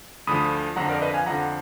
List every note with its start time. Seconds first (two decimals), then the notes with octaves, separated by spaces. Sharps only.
0.27 D2 D3 F3 B5 D#6
0.76 F2 D3 F3 F#5 A#5
0.89 A#4 D5
1.02 B4 D#5
1.14 F5 G#5
1.26 F2 D3 F3 F#5 A#5